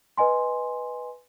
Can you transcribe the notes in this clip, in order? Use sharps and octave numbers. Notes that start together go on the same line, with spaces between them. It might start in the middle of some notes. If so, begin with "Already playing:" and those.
B4 D#5 G#5 C6